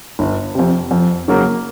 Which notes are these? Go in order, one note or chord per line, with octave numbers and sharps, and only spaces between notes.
G1
F2 C3
F2
C#3 F#3 A#3